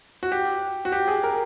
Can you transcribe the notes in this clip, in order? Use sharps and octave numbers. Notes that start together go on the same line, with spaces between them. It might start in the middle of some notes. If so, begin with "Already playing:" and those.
F#4
G4
F#4
G4
G#4
A#4